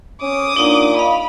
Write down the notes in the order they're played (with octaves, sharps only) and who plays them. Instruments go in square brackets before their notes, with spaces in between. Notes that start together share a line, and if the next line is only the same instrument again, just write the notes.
[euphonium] C#4 [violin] D6 D#6
[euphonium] A#2 [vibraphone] D4 D#4 F#5
[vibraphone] D#5 F5 [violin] B5